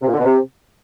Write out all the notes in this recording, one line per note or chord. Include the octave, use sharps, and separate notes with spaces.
C3
A#2
D3
B2
C3